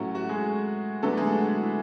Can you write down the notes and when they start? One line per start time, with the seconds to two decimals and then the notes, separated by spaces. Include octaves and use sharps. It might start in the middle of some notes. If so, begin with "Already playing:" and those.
Already playing: A2 F#3 A3 C#4 F#4
0.15 F#4
0.29 G#3 G#4
1.02 D3 F#3 A3 B3 D4 A4
1.17 G#3 G#4
1.32 F#4
1.62 E4